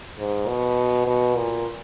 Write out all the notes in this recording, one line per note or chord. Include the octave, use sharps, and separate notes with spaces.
G#2
B2
B2
A#2